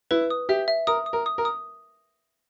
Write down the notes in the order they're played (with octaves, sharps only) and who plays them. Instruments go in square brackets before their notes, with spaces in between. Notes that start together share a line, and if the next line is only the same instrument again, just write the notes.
[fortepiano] E4 [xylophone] B4
[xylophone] D#6
[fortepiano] G4 [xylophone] E5
[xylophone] E5
[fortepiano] A#4 [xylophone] D#6
[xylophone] D#6
[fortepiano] A#4
[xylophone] D#6
[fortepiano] A#4
[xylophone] D#6